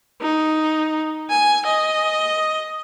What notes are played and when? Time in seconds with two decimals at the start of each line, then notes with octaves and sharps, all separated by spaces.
0.21 D#4
1.29 G#5
1.65 D#5